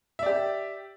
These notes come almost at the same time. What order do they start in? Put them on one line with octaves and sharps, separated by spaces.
E5 D5 G4